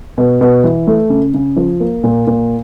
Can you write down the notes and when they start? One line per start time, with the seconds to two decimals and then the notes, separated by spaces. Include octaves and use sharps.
0.18 B2
0.41 B2
0.64 E3
0.87 A3
1.10 C#3
1.34 C#3
1.56 F3
1.80 A#3
2.04 A#2
2.27 A#2